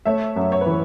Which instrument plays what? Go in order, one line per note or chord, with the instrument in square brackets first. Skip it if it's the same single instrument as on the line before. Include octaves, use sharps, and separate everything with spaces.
[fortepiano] A3 [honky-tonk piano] C#5 E5
[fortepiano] F#2
[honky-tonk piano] C#5
B4
[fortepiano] E3